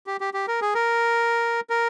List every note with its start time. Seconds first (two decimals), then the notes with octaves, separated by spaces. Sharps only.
0.07 G4
0.21 G4
0.34 G4
0.48 A#4
0.62 G#4
0.75 A#4
1.70 A#4